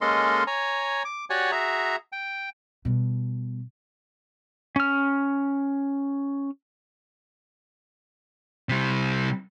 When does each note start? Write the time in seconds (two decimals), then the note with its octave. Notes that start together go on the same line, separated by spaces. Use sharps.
0.01 G#3 A#3 C#4 A4 D#5 C6
0.47 C#5 G#5 A#5
1.05 D6
1.30 F#4 G4 C#5 D5 F#5 G#5
1.52 F#4 G#4 E5 A#5
2.12 G5
2.85 B2 G3
4.76 C#4 F6
8.69 C3 G3